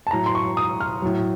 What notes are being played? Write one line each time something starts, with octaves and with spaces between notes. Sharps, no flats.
A5
A2 F#3 A#5
C6
C#6
D#6
F6
A2 F#3